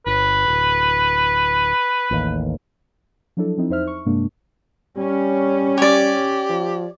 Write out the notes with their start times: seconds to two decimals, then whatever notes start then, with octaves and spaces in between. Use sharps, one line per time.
0.06 G1 B4
0.48 D1
2.11 A1 D#2
3.37 F3 F#3 D4 E4 A4
3.57 F3 C4 D#4 E4
3.69 E2 D#4 C5 E5 F6
3.87 C#6
4.05 G2 C3 G#3 A#3 D4
4.97 G3 C#4
5.78 G4 C#5 D5
6.50 F3